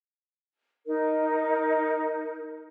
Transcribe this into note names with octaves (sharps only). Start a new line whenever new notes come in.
D#4 A#4